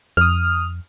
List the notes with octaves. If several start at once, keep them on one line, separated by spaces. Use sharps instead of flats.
F2 D#6 F6